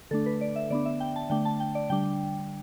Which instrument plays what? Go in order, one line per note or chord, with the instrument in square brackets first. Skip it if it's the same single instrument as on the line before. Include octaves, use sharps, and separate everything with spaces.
[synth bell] D3 A3 D4 A4
B4
D5
E5
D3 B3 D4 D5
E5
G5
A5
D3 A3 D4 G5
A5
G5
D5
D3 G3 D4 G5